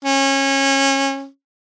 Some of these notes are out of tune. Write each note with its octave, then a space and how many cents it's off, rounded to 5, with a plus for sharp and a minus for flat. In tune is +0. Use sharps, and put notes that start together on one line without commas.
C#4 -25